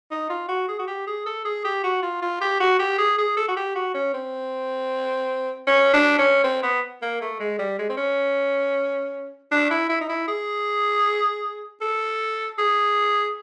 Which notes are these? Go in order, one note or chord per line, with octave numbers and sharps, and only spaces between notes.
D#4
F4
F#4
G#4
F#4
G4
G#4
A4
G#4
G4
F#4
F4
F4
G4
F#4
G4
G#4
G#4
A4
F#4
G4
F#4
C#4
C4
C#4
D4
C#4
C4
B3
A#3
A3
G#3
G3
G#3
C4
C#4
D4
E4
E4
D#4
E4
G#4
A4
G#4